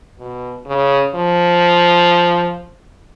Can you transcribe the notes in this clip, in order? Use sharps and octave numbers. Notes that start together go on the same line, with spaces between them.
B2
C#3
F3